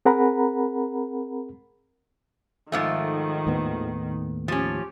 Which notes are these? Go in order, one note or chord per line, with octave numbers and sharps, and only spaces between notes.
C4 G#4 A#4 F#5 A#5 B5
G#2 D#3 F3 A3
D#2 A2 B3
F3 C#4 G4